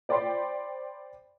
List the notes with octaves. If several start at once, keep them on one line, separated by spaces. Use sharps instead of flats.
C5 D5 G5 B5 C6